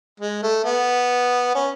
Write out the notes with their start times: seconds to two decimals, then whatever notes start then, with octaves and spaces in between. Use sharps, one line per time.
0.20 G#3
0.43 A3
0.64 B3
1.55 C#4